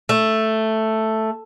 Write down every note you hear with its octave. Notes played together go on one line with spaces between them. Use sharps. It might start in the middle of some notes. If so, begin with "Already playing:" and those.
A3